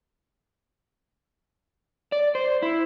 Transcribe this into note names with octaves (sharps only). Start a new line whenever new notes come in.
D5
C5
E4